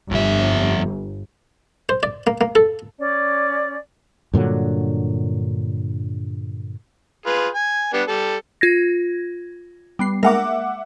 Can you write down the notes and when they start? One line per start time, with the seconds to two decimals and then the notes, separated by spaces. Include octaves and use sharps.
0.11 G1 F2 E5
1.89 C5
2.03 D5
2.27 A#3
2.41 A#3
2.55 A4
2.99 C#4 D5
4.34 G2 A#2 D3 F#3
7.26 F4 G#4 B4
7.55 G#5
7.93 G3 B3 D4
8.07 G3 A4
8.61 F4 G#6 A#6
9.99 G3 B3 C7
10.23 G#3 A#3 A#4 E5 F#5 D6